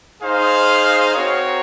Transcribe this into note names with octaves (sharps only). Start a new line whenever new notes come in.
D#4 G#4 C5 F5
C4 F#4 A#4 C#5